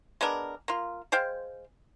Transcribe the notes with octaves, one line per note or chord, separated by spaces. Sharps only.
G#3 B3 D4 A#4
A#3 F4
G#3 C5 F5 G5